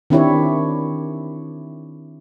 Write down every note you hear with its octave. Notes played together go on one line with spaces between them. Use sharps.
D#3 C4 D4 E4 G4 C#5